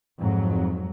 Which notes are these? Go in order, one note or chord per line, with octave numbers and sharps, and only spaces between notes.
F2 G#2 F#3